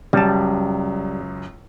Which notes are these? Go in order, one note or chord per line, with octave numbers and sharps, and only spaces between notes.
C#2 F#2 G3 A5